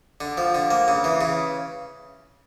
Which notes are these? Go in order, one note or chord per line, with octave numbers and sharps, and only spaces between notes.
D3
F3
D3
A#3
C#3
E3
C#3